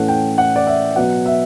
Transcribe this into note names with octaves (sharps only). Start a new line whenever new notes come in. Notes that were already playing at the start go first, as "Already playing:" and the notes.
Already playing: A2 E3 A3 C#4 F#5
G5
F#5
D5
E5
B2 F#3 B3 F#5
E5